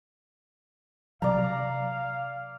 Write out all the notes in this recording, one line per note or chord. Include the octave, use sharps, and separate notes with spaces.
C3 F#3 D5 F5 A#5